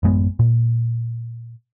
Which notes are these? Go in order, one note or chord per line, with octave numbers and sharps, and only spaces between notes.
A1 F#2 G#3 B3
A#2